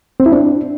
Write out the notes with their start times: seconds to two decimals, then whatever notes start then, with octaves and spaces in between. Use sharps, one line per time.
0.20 C4
0.26 E4
0.32 D4